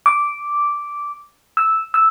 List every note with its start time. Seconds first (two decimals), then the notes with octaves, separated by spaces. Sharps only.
0.06 D6
1.57 E6
1.94 E6